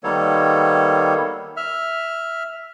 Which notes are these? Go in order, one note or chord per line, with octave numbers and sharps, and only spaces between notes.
D#3 G3 A#3 B3 A4 C#5
E5 F6